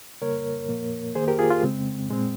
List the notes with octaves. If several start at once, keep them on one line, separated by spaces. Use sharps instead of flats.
C#3 G3 A#3 A#4 C#5
A#2 F3 A#3
D#3 A#3 G#4 C5
G4 A#4
F4 G#4
F4
C#3 G#3 C4
A#2 G#3 C4